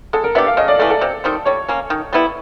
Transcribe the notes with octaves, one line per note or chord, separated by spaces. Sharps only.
G#3 A4
A#4
B3 D4 G4 E5
F5
C#3 D#5
D5
E3 A3 A4
A4
C3
D#3 G3 C4
G3 C#5
A#3 C#4
D#3
G3 B3 E4